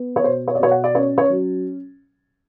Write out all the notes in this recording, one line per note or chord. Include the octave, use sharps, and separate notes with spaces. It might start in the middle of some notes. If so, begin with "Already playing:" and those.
Already playing: B3
C#5
B2 C5
C#5
D5
B2 C#5
F#5
D5
C#4 C#5
C#5
F#3